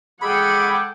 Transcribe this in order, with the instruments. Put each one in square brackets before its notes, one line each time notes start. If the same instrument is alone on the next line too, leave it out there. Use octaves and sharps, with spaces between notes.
[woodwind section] G#3 G#4 A4 [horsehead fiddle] F#5 G5 [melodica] B5 [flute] D6